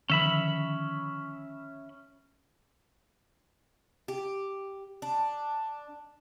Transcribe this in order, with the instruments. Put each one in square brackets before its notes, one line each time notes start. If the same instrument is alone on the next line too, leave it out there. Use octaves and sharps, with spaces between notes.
[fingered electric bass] D3 D#3 F3 [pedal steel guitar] C#4 E5 B5
[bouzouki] G4
D4